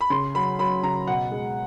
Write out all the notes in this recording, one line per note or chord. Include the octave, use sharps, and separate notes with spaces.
B5
C#3 C6
F#3 B5
F#3 B5
C#3 A#5
B2 F#5
G#3